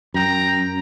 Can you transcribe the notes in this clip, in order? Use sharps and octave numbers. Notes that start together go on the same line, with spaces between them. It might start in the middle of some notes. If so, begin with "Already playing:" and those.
F#2 G5 A#5